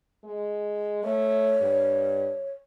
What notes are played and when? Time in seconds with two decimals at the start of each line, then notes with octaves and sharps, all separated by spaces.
0.24 G#3
1.04 A3 C#5
1.61 G2